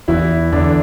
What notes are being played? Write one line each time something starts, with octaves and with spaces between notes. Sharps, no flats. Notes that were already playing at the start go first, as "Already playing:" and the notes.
E2 E3 E4
E2 D3 D4